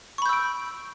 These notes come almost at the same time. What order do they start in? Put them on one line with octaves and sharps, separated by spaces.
C#6 B5 G6 E6 D7